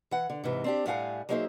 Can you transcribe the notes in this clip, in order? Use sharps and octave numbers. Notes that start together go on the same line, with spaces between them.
E3 F#5
D3
G#2 C3 E3
C4 D4 G4
A2 G3 A3 F5 F#5 G#5
F#3 A#3 D#4 G#4 C5 E5